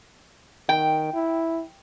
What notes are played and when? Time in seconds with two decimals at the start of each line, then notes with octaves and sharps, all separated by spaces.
0.69 D#3 G5
1.14 E4